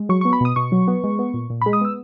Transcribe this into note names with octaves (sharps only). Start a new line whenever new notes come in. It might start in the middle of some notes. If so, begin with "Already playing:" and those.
Already playing: G#3
F#3 C#6
B3 C#6
B5
B2 D#6
B2 C#6
F#3
B3
G#3
B3
A#2
A#2
G#3 B5
D#6
B3 E6